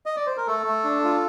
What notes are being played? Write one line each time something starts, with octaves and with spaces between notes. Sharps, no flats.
D#5
D5
C5
A#4
A3 A4
A3
D4
F4